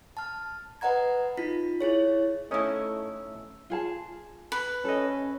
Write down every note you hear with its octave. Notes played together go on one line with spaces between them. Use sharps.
A5 F6
B4 D#5 F#5 A#5 G#6
D#4 F4 B6
E4 G#4 C#5
A3 C#4 D#4 E4 D#5
F4 G#4 A5
B4
C#4 A4 D#5